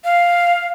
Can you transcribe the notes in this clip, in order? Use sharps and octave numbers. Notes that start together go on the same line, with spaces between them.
F5